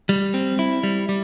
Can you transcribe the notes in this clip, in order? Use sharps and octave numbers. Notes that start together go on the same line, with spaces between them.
G3
C4
E4
G3
G3